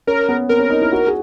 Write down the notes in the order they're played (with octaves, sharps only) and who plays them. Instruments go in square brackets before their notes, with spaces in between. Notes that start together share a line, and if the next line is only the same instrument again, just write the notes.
[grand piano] C#4 [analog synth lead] A#4
[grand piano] B3
[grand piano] C4 [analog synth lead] A#4
[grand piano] C#4
D#4
E4
F#4
G#4